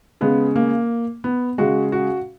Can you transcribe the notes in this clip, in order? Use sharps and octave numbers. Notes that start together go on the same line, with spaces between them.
C#3 G#3 B3
A#3
B3
C#3 G#3 F#4
F#4